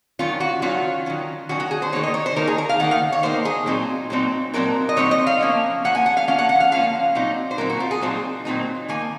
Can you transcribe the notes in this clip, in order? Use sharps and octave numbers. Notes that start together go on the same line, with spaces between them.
D#3 F#3 C#4 F4
F#4
D#3 F#3 C#4 F4
D#3 F#3 C#4
D#3 F#3 C#4 F#4
F#4
G#4
C5
D#3 A#3 D#4 C#5
D#5
C#5
C5
D#3 A#3 D#4 A#4
G#4
A#4
F5
D#3 A#3 D#4 F#5
F5
C#5
D#3 A#3 D#4 C5
G#4
A#2 F#3 C4 D#4
A#2 F#3 C4 D#4
A#2 F#3 C4 D#4 A#4
D#5
A#2 F#3 C4 D#4 C#5
D#5
F5
F3 A#3 C#4
F3 A#3 C#4 F#5
G#5
F#5
F5
F3 A#3 C#4 F5
F#5
F#5
F5
F3 A#3 C#4 F5
A#2 F#3 C4 D#4
C5
A#2 F#3 C4 D#4 A#4
F#4
F4
G#4
A#2 F#3 C4 D#4 C5
A#2 F#3 C4 D#4
D#3 A#3 G#5